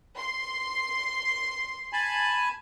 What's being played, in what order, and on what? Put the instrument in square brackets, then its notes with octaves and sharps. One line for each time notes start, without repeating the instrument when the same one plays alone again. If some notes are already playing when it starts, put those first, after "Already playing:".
[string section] C6
[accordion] G#5 A5 B5